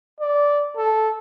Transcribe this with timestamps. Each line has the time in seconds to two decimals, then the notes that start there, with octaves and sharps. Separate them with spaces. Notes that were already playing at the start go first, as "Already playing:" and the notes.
0.20 D5
0.76 A4